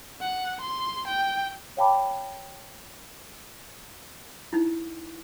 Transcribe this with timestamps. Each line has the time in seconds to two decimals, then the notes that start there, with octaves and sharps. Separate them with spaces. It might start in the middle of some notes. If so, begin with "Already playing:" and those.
0.21 F#5
0.61 C6
1.08 G5
1.77 C#5 F5 G5 A5 B5 D6
4.53 D#4 E4